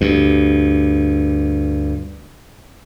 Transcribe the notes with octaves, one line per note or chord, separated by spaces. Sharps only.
D2 G2